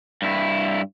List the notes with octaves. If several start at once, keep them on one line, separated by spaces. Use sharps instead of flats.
G2 E4